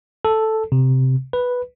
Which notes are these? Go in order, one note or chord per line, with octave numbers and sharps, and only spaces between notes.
A4
C3
B4